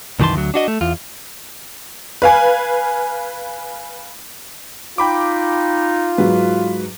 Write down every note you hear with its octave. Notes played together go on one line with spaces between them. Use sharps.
C2 F#2 D#3 E3 A5 C6
D2 F#3
D4 F#4 D#5
A3
E2 F4
B4 F5 G#5
D#4 F4 G5 B5 D6
G#2 F#3 B4